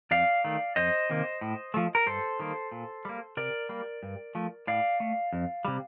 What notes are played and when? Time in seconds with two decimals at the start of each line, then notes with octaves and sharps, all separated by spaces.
0.11 F2 D5 F5
0.45 D#3 A3
0.76 F2 C5 D#5
1.10 C3 D#3 A#3
1.41 A2
1.74 F3 A3
1.95 A#4
2.06 G2 A4 C5
2.39 D#3 G3 A#3
2.72 A#2
3.05 G3 A#3
3.37 C3 A#4 D5
3.69 G3 A#3
4.03 G2
4.35 F3 A3
4.67 A2 D5 F5
5.00 A3
5.33 F2
5.65 C3 G3